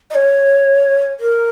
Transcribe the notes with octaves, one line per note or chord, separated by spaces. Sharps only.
D#5
C#5
A#4